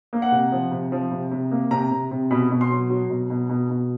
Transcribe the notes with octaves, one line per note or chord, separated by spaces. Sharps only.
A#3
F#5
C3
F3
C3
F3
C3
C3
A#3
C3 A#5
C3
C3
B2 B5
B2
C6
F#3
F#3
B2
B2
B2
B2